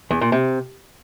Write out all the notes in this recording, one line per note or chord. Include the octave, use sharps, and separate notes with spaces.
E2
A#2
C3